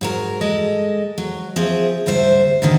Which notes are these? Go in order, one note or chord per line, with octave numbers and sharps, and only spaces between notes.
G#2 F#3 A#4
G#3 A4 D#5
F#3
F3 C4 G#4 E5
D2 G#2 G3 C5 E5
G#2 B2 D3 D#3